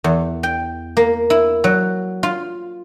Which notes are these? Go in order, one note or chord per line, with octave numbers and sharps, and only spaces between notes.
E2
G5
A#3
E4
F#3
F4